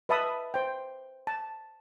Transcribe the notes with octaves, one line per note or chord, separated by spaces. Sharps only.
B4 D#5 E5 A5 B5 D#6
C5 G5
A5